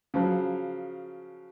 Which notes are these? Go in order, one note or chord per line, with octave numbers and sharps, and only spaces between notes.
C#3 F3 F#3